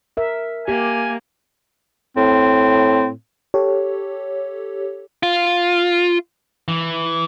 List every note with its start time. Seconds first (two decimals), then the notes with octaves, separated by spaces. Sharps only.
0.17 A#4 E5
0.68 A#3 G4 G#5
2.16 A2 C4
3.54 G4 A4 C#5
5.23 F4
6.68 E3